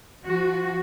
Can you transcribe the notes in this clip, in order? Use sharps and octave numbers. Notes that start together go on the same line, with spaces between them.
F3 F#4